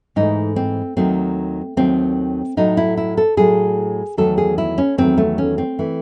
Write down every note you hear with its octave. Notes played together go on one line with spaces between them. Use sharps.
G#2 E3 A3 D#4
C4
D#2 D#3 F#3 A3 C4
D#2 D#3 F#3 A3 C4
A2 F#3 A3 D#4
E4
E4
A4
A2 F#3 A3 G#4
E2 D#3 F#3 A3 A4
G#4
E4
C#4
E2 D#3 F#3 A3 C4
A3
C#4
C4
E3 A3